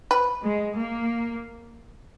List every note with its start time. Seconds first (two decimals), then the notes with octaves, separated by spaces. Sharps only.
0.11 B4
0.44 G#3
0.77 A#3